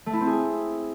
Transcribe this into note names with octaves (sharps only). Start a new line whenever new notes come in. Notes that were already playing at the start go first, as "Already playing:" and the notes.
A3
E4
C4
G#4